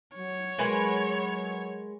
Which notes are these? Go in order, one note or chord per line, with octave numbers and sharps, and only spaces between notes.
F#3 C#5
F#3 G#3 A#4 B4